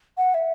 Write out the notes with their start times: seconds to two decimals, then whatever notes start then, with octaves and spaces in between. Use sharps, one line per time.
0.17 F#5
0.34 E5